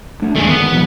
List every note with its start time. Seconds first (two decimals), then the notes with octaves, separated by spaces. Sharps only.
0.22 A3 D4
0.36 E2 G#2 A3 G#4
0.48 G1 G#2 D#3 B3
0.70 A#1 E3 F#3